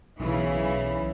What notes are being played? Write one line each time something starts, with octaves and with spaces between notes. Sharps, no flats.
B1 C#3 E3